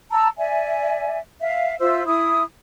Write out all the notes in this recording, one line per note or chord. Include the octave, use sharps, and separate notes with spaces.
A5 A#5 E6
D5 E5 G#5
E5 F5
F4 C5 E5 E6
E4 D#6